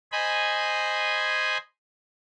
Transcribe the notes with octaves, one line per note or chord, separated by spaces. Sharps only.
C5 D#5 G#5 B5